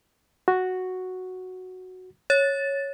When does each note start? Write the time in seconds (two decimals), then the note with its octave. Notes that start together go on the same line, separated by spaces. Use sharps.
0.48 F#4
2.30 C#5 A6